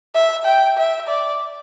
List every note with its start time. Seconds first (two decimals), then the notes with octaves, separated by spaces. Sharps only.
0.14 E5
0.45 G5
0.77 E5
1.08 D5